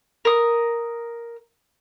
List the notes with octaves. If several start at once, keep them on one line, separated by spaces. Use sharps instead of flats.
A#4 D#6